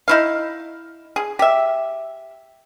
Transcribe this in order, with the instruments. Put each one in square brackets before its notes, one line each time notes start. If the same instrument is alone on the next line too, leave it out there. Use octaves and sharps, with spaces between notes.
[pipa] D#4 E4 F5
G#4
G4 E5